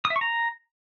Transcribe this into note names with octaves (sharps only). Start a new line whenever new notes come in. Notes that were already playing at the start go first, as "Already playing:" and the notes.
D#6
E5
C#6
A#5